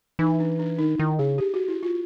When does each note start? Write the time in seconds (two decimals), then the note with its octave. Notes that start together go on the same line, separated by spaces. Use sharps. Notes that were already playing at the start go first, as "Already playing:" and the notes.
0.19 E3 D#4
0.40 D4
0.59 D4
0.78 D#3 D#4
0.98 D#3 E4
1.19 C#3 G#4
1.38 G4
1.54 F#4
1.68 E4
1.83 F4